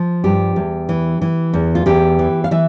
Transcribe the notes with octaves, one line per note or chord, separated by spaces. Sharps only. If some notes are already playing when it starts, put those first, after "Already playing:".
Already playing: F3
G2 G4
E2
E3
E3
E2
F4
E2 G4
E3
F5
E3 E5